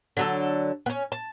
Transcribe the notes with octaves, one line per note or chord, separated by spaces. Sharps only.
D3 F#3 A4
B3 C#4
A5